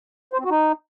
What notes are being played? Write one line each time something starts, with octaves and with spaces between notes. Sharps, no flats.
C5
C4
F#4
D#4